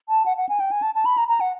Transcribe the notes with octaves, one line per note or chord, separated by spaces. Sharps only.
A5
F#5
F#5
G#5
G5
G#5
A5
A5
B5
A#5
A#5
F#5